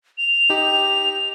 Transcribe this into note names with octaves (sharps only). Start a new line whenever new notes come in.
F7
D#4 G4